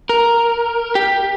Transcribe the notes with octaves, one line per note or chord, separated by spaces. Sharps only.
A#4
G4